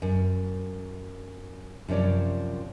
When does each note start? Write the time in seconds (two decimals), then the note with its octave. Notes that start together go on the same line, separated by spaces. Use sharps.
0.02 F#2
1.88 F#2 C3 F3 C#5 D5